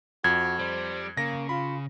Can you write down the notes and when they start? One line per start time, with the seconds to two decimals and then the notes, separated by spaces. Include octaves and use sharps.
0.24 F2 F#4 G#6
0.59 G3 C5
1.17 C#3 A#3 A#6
1.49 F4 B5